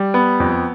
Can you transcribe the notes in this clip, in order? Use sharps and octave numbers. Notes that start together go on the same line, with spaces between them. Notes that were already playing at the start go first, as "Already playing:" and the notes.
Already playing: G3
B3
F2